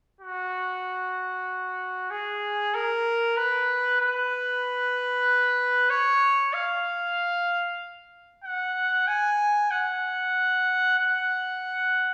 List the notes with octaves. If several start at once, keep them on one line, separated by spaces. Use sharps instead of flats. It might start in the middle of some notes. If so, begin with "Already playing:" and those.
F#4
G#4
A#4
B4
B4
C#5
F5
F#5
G#5
F#5
F#5